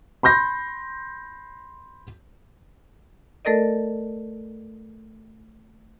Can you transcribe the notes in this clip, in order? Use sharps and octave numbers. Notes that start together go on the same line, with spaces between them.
B5 C6 G6 A#6
A3 A4 A#4 D5 D#5